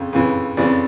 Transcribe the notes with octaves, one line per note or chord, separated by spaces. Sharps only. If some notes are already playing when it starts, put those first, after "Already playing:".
Already playing: F2 C#3
F2 C#3 E3
F2 C#3 E3 D5